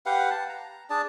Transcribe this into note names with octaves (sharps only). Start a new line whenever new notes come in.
G4 B4 F5 F#5
A5
A#5
D4 G#4 D5 A5